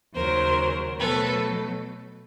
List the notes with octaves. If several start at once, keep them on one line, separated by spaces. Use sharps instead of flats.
D#2 C#3 F#3 A#4 C5
B2 F#3 A3 A4 B4